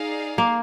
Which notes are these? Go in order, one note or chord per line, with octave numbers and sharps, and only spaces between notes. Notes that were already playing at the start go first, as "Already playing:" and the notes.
Already playing: D#4 G#4 D5 F5
A#3